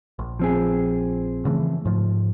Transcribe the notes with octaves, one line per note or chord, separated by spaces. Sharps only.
A#1
F3 C4 G#4
C#3 E3 A3
G#2 F3